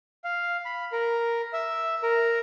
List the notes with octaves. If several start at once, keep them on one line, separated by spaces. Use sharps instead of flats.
F5
B5
A#4
E5
A#4